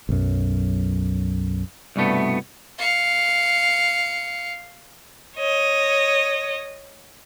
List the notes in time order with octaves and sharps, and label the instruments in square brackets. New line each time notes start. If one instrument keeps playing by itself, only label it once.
[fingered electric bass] B1 F#2
[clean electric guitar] C2 G2 B2 A3 B3
[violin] F5 C#7
C#5 D#5